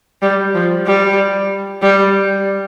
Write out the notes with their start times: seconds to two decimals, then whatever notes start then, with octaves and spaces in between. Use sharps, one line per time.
0.22 G3
0.54 F3
0.87 G3
1.82 G3